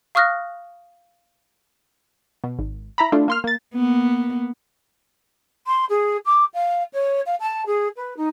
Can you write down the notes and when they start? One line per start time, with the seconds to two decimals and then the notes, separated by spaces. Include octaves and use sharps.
0.15 F5 C#6 D#6 F6 F#6 A#6
2.44 B2
2.59 G#1
2.98 E4 A#5 B5
3.12 A3 D4 E4 F4
3.28 A#3 C6 F6
3.44 A#3 A6
3.75 A#3 B3
5.67 C6
5.89 G#4
6.25 D6
6.54 F5
6.93 C#5
7.26 F5
7.40 A5
7.66 G#4
7.97 B4
8.17 D#4